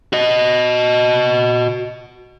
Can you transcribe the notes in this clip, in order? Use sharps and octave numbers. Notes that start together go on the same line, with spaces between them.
F#4 D#5